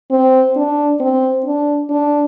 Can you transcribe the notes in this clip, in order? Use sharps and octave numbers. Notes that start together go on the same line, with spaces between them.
C4
D4
C4
D4
D4